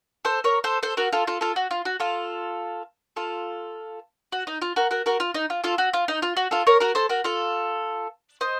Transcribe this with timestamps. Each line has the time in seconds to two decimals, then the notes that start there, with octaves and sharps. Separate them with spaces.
0.25 A4 C5
0.44 A#4 C#5
0.64 A4 C5
0.83 A4 C5
0.97 F#4 A#4
1.13 F4 A4
1.27 F4 A4
1.41 F4 A4
1.56 F#4
1.71 F4
1.85 F#4
2.00 F4 A4
3.16 F4 A4
4.32 F#4
4.47 D#4
4.62 F4
4.76 F#4 A#4
4.91 F#4 A#4
5.06 F#4 A#4
5.20 F4
5.34 D#4
5.50 F4
5.64 F4 A4
5.78 F#4
5.94 F4
6.08 D#4
6.22 F4
6.37 F#4
6.51 F4 A4
6.67 A#4 C#5
6.80 F#4 A#4
6.95 A4 C5
7.09 F#4 A#4
7.24 F4 A4
8.41 C5 D#5